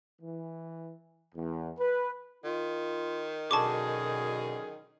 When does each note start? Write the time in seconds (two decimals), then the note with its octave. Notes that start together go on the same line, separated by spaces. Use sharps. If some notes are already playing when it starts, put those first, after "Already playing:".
0.22 E3
1.35 E2
1.79 B4
2.44 D#3 F4
3.51 F#2 B2 D3 G#4 A5 C#6 D6